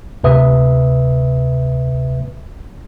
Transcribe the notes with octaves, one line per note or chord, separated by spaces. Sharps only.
D2 C3 B4 E5 D#6